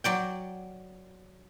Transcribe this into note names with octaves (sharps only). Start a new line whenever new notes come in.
F#3 D5 G5